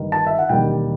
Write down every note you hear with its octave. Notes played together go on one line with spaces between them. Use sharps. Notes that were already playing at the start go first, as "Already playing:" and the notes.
Already playing: G1 G2 D#3
A5
E5
F#5
E1 D#2 D#3 G3 G5